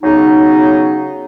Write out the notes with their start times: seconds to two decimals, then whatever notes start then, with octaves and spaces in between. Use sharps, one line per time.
0.03 C#3 F#3 B3 D#4